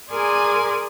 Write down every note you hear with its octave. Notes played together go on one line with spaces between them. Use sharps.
G#4 A#4 D5 G#5 C6